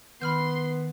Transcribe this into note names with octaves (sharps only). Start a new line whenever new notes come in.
D#3 B3 B5 C6 F6 G6